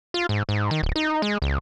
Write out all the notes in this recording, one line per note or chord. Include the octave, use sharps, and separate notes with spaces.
F4
G#2
G#2
D#3
D1
D#4
G#3
C#2